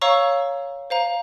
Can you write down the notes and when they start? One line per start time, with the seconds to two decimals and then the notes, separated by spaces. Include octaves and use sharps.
0.02 C#5 F5 A#5 C#6 E6
0.90 C5 F5 A#5